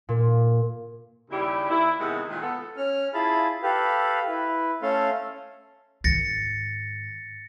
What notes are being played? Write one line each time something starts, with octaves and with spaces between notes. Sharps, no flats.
A#2
D#2 C#3 G3 E4 G4
D#2 E4
E2 C3 D#3 G#3
A#2 D#3 G#3
B3 A4
C#4 F6
E4 F4 G#4 A5 B5
G4 A4 B4 F5
E4 B4
A3 C#4 A4 F5 C6
G#2 D#3 A6 A#6 C#7